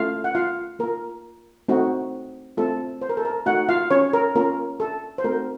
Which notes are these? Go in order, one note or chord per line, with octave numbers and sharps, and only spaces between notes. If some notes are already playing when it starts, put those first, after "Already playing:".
Already playing: A3 C#4 F4 F5
F#5
F4 F5
A#3 F4 A#4
A3 C4 D#4 F#4
A3 C4 F4 A4
C5
A#4
A4
A#4
A3 D#4 F#4 F#5
F4 F5
C#4 C#5
A#4
A#3 C#4 F4 A#4
A4
C5
A3 C4 D#4 F#4 A#4